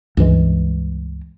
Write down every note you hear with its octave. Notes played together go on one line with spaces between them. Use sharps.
C#2 G2 E3 G#3